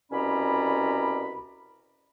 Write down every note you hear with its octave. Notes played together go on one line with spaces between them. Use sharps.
C2 B2 C#4 D5 A#5 B5